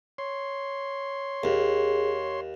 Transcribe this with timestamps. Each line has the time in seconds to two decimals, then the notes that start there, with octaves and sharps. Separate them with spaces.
0.18 C#5 C6
1.44 D#2 G#4